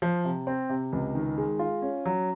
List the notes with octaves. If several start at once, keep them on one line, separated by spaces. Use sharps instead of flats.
F3
C3
C4
C3
C#2
D#3
G#3
F4
C#4
F#3